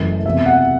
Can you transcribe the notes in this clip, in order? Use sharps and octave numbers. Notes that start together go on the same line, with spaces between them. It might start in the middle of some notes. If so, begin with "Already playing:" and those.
Already playing: F#1 F#2 E3 A3
F#1 E2 C3 E5
F#5